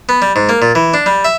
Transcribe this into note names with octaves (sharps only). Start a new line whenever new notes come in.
B3
G3
G#2
A#3
A#2
E3
D4
G3
E5